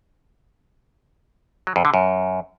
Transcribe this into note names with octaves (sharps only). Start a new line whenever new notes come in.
F#3
F2
D3
F#2